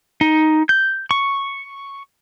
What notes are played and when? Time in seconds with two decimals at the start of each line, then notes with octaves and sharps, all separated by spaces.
0.21 D#4
0.69 G6
1.11 C#6